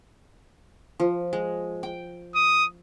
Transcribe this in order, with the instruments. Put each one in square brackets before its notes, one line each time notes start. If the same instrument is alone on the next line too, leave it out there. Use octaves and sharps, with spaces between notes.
[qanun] F3
G#3
G5
[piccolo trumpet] D#6